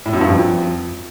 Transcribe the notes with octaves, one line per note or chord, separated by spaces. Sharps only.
A2
F#2
G2
F2